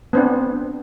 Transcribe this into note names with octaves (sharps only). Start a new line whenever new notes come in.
B3 C4 D4